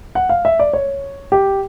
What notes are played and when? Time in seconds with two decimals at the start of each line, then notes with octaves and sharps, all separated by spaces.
0.15 F#5
0.29 F5
0.45 E5
0.59 D5
0.73 C#5
1.32 G4